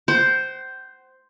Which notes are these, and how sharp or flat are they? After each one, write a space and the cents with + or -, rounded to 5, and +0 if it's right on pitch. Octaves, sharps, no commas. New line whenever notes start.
C5 +0 F#5 +45